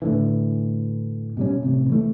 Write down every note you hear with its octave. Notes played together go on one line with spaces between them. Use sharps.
A2 D3 E3
B2 G3 C#4
A1 C3
E3 A3